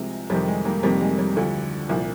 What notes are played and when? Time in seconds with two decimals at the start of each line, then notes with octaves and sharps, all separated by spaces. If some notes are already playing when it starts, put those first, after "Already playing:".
Already playing: C2 C3 F3 G#3
0.30 F2 C3 D#3 G3
0.47 G#3
0.65 G3 A#3
0.83 F2 C3 D#3 G3 A#3
1.01 G#3
1.18 G3
1.36 D2 D3 F3
1.89 C2 A#2 F3